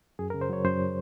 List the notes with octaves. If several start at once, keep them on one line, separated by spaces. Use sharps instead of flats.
F#2 G#4
A#4
C#3
C5
F#3 C#5
F#2 C5